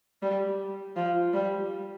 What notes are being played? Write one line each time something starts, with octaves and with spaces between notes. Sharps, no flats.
G3
F3
G3